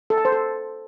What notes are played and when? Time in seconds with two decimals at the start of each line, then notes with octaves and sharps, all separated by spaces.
0.10 A4
0.18 A5
0.25 C5
0.32 A4